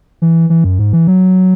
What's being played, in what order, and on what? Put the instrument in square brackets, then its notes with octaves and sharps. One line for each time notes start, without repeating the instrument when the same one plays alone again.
[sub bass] E3
E3
F#2
G#2
E3
F#3